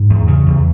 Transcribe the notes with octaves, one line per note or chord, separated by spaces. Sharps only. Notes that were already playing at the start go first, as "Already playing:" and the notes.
Already playing: G#2
E2
C#3
E2